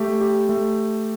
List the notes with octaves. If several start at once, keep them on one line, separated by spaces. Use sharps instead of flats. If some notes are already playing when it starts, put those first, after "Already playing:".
Already playing: A3 G4
G4
A3